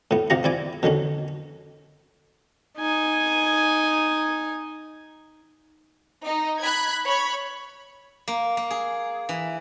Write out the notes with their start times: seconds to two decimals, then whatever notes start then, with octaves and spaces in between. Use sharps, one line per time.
0.11 A2 B3
0.30 C3 F4 G4 D#5 F#5 A#5
0.44 C4 E4 D5 G#5
0.83 B2 D3 D#3 C#4
2.78 D#4 G#5
6.26 D#4
6.61 B5 F#6 G#6
7.05 C#5 B5
8.28 A#3
8.57 A#3
8.70 G#4
9.29 E3